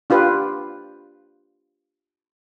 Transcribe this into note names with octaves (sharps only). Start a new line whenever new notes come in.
D4 F4 G4 B4